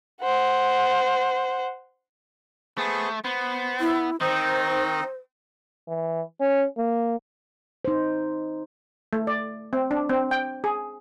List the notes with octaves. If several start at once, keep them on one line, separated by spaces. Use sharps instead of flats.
C5 F#5
A3 B3 G#4 C5
B3 C5
E4
D#3 C4 D#4 C5 D#5
E3
C#4
A#3
D#4 C5
A3
D5
C4
D4
C4
G5
G#4